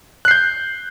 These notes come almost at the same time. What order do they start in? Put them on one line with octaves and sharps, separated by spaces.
F#6 C7 G6